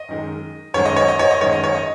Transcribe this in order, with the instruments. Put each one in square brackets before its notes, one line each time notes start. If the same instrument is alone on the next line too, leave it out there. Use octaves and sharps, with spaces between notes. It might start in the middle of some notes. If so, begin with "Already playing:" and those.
Already playing: [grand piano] D#5
F#2 D#3 G#3
F#2 D#3 G#3 C#5
D#5
C#5
D#5
C#5
D#5
F#2 D#3 G#3 C#5
D#5
C#5
D#5